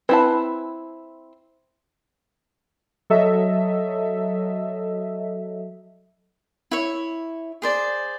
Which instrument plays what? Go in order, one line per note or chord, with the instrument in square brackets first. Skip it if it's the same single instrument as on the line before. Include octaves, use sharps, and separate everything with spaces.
[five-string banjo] C4 E4 A5 [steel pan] B4
[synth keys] F#3 A4 D#5 E5
[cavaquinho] E4 C#5
G#4 C5 D5